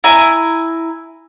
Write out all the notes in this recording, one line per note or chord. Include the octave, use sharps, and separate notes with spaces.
E4 G#5 A#5